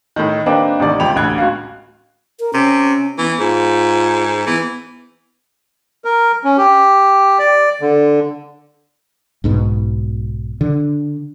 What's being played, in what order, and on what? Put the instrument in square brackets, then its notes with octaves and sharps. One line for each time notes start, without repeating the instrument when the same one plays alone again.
[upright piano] A2 D#3
A#3 C4 D4 D#4 G4 B4
A1 C3 D#3 D5
C#2 F3 G4 B5 F7
A1 D2 F#6 G#6
C#2 F#4 F5
[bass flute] A#4
[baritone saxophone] C3 [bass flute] C#4
[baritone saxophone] E3 [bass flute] B3
[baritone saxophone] G#2 [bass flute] F4
[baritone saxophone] E3 [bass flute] B3
[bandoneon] A#4
C#4
G4
D5
D3
[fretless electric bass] B1 G#2 B2
D3